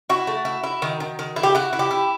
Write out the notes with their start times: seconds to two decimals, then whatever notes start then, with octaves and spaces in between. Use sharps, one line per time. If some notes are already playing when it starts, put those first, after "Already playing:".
0.09 E4 F#4
0.27 A3
0.45 E4
0.63 E4
0.82 D#3
1.00 D#3
1.19 D#3
1.36 E4
1.43 G4
1.55 E4 F#4
1.73 E4
1.79 G4
1.91 E4